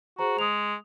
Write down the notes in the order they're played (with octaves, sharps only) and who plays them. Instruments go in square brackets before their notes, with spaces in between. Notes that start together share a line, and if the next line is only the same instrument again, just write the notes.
[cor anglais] F#4 [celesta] G#4 C5 A#5
[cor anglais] G#3 [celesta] D#6 F7